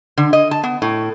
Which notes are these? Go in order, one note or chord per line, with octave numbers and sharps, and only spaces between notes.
D3
D#5
A5
B3
A2